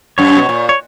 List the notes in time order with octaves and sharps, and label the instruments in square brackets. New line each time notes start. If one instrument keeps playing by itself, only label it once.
[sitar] F#2 [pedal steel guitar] C#5
[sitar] B2
A#2
[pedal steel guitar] C#5